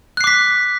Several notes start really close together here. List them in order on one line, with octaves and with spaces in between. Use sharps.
F#6 C7 D6 B6